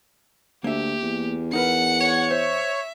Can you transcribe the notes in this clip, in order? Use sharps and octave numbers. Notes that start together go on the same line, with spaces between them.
D2 A#3 G4 E5
E2
D#4 A#4 B4 F#5 C#7
C#5
C5 E5